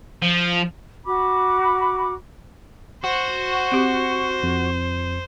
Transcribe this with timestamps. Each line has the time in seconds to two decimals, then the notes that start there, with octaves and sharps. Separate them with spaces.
0.22 F3
1.06 F#4 B5 D6
3.04 F#4 C5
3.72 C4 G4
4.43 F2